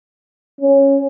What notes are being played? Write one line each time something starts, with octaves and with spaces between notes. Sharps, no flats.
C#4